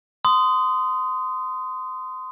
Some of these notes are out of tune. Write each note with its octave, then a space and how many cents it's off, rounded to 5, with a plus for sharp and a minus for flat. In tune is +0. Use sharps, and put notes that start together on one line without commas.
C6 -25 D#6 +0